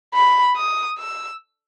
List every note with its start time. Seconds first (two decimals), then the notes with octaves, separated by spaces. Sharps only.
0.14 B5
0.57 D#6
0.98 E6